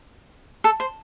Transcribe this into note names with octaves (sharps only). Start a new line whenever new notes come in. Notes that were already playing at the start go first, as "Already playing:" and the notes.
A4
C5